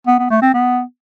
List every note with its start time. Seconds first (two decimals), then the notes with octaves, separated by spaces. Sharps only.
0.07 B3
0.19 B3
0.31 A3
0.42 C4
0.54 B3